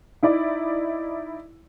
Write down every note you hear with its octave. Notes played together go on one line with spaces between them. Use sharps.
D#4 E4 D5